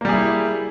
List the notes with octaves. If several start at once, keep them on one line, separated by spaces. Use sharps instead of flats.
G3 A#3 E4 G#4